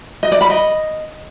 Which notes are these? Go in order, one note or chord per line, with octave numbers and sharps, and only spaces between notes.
D#5
D5
B5
D#5